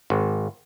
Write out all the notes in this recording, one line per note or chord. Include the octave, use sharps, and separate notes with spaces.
G#1